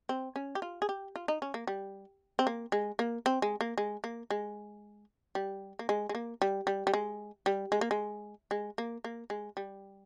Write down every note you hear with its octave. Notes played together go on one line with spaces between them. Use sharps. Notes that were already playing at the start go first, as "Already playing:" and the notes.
C4
C#4
G4
F4
G#4
G4
F4
D#4
C#4
A#3
G3
C4
A#3
G#3
A#3
C4
G#3
A#3
G#3
A#3
G#3
G3
A#3
G#3
G#3
A#3
G3
G3
G3
G#3
G3
G#3
A#3
G#3
G#3
A#3
A#3
G#3
G3